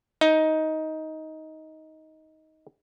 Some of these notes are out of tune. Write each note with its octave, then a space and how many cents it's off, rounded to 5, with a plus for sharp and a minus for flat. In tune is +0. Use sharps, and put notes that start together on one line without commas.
D#4 +15